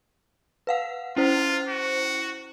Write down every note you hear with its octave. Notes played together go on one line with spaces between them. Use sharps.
B4 F5 F#5
C#4 E4 F4 C5
F#4